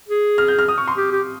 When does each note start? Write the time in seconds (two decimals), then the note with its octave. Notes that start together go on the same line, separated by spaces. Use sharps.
0.08 G#4
0.38 F6
0.48 G6
0.59 F6
0.68 D#6
0.78 C#6
0.88 C6
0.97 G4
1.12 G4